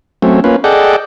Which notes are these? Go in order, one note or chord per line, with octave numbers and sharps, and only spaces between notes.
F#3 A3 C4 C#4
A#3 C#4 F4 B4
G#4 A4 D5 D#5 F#5 G5